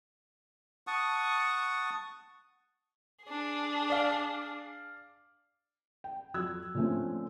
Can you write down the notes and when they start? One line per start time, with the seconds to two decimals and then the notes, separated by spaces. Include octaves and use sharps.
0.87 F#5 A5 C#6 D#6
3.24 D4 G#4
3.90 D5 F5
6.04 G5
6.34 F2 F#3 F#4 E6 F#6 G#6
6.74 A#2 D3 F3 A3 C4 C#4